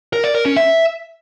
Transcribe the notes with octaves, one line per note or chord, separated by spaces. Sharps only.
A#4
D5
A#4
C#4
E5